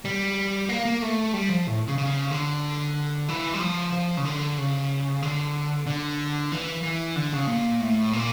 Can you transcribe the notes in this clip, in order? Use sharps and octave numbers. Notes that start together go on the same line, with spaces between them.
G3
A#3
A#3
A3
G3
F3
A2
C#3
C#3
D3
E3
G3
F3
F3
C#3
D3
C#3
D3
D3
E3
E3
D3
C#3
A#2
A2
A#2